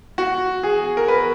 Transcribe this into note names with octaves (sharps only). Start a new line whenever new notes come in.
F#4
G#4
A#4
B4